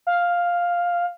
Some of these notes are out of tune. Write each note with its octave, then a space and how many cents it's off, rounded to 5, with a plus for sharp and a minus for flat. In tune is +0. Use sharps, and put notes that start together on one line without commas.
F5 +5